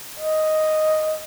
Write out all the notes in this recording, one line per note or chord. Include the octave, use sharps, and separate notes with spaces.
D#5